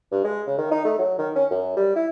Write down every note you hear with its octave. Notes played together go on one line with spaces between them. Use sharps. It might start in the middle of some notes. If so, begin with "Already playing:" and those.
G2
G#3
C#3
D#3
D#4
A3
F#3
D#3
C#4
F#2
G3
E4